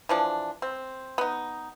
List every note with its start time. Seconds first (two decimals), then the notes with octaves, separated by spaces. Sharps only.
0.09 E3 F3 D4
0.62 C4
1.18 B3 D#4